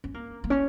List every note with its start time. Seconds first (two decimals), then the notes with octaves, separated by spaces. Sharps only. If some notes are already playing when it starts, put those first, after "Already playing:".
0.04 C#4
0.14 A#3
0.44 A#3
0.50 C#4